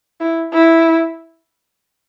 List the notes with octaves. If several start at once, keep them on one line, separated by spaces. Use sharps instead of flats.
E4
E4